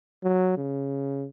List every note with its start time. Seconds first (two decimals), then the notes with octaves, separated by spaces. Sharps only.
0.23 F#3
0.57 C#3